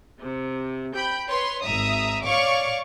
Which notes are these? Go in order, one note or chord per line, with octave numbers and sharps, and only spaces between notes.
C3
G5 B5 G6
B4 C#5 C6
G#1 E5 A#5 D#6
C#5 D5 F5 C#6 D6